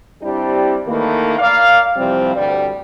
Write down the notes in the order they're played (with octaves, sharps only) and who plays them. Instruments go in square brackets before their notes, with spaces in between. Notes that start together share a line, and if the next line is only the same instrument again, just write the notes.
[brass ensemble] G3 C4 D4 E4 G4
D#3 E3 A3 A#3
A#4 D5 F5
C3 E3 F3 G3 C4
D2 G2 G3